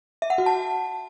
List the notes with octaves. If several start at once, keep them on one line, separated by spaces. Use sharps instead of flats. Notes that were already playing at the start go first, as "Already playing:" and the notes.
E5
F#5
F#4
A5